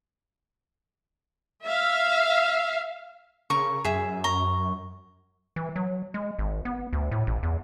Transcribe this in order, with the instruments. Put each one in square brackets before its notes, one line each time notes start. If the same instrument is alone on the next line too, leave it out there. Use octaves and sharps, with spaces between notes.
[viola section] E5 F5
[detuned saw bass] C#3 [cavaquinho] A#4 C#6
[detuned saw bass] F#2 [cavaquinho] G#4 E5
[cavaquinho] A#5 [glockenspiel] C#6
[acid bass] E3
F#3
G#3
G#1
B3
D2
A2
A1
E2